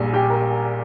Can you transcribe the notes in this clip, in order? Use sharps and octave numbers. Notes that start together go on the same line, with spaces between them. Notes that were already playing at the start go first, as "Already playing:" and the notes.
Already playing: A#1 A#2 G3 G#4 G#5
G4 G5
A#4 A#5